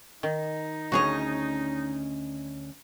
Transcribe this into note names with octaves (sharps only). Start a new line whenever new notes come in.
D#3 D#4
D2 C#4 F#4 G#4 C#5 D#5